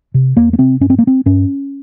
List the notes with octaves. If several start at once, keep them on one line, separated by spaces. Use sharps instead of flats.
C3
E2 A#3
A#3
C3 C4
G2 C#4
C4
A#3
C4
G2 C#4